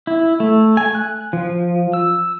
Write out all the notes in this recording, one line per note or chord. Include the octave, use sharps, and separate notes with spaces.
E4
A3
G#5
F#6
F3
E6